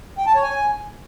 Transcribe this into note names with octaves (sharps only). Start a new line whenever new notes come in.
G5
A5
C#5
G#5